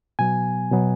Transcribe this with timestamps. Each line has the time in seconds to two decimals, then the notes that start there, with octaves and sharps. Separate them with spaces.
0.19 B2 F#3 B3 G#5
0.72 B2 F#3 B3